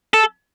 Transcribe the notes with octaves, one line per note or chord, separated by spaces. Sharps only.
A4